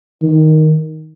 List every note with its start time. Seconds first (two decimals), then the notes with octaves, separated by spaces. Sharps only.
0.22 D#3